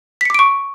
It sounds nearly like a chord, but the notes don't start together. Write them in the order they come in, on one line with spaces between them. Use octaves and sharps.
B6 C#7 D6 D7 C#6